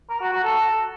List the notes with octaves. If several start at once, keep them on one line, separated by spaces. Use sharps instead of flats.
A#4
F#4
F#4
A4